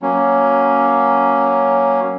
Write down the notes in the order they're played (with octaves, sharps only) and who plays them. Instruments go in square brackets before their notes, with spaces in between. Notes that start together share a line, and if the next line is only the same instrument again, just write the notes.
[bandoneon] F#3 A#3 C#4